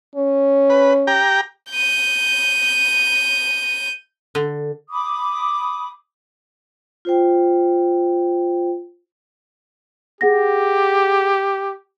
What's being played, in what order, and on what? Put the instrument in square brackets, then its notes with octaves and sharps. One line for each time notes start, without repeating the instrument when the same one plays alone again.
[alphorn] C#4
[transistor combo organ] B4
G4 G5 A#5
[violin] G6 D#7
[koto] D3
[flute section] B5 D6 D#6
[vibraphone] F4 C5 G5
[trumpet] G4 [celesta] G#4 F#5 A#6